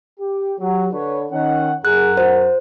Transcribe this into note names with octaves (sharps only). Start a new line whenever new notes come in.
G4
F#3 G4
D3 B4 C#5
D#3 C#4 D#4 F#5
F#2 G#4 A#4 F#5 F#6
F#4 C5